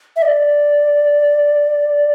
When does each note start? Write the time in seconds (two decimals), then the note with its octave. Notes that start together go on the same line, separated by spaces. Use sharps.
0.16 E5
0.22 D5